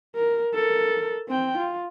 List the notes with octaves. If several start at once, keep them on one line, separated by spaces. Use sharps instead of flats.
A#4
A4 A#4
C4 G5
F4